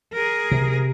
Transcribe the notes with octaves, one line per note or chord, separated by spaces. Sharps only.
G#4 A#4
C3